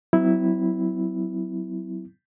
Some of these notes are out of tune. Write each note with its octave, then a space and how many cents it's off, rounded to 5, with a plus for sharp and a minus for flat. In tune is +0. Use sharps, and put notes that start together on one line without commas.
F#3 +20 C4 -45 E4 -5